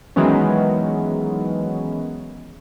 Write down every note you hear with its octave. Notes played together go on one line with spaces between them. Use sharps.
D#3 E3 F#3 G#3 B3 C#4